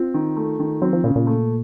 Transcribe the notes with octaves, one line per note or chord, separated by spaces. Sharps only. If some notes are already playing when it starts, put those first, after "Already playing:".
Already playing: C4 F4
D#3
A3
D#3
F#3 C4
F3
A#2 C#3
A#2
A3